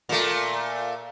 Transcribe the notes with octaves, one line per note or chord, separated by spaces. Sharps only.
A#2 A3